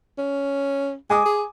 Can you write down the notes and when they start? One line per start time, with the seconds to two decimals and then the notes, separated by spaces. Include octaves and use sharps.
0.18 C#4
1.10 G#3 G#5 D6 D#6
1.25 G#4